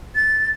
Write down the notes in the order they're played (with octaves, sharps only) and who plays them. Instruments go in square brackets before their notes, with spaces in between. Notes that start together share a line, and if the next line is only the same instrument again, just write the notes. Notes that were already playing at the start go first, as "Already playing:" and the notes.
[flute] A6